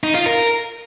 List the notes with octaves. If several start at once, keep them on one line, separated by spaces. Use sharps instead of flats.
D#4
F4
A#4